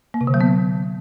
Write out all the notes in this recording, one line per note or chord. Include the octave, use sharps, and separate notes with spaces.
A#3
C3
D3
F#3
B3